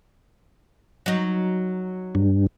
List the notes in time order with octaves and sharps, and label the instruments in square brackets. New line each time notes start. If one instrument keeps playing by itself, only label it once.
[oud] F#3 D#4
[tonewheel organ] G2